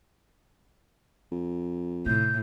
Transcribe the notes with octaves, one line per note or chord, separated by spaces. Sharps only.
F2
A2 C3 G6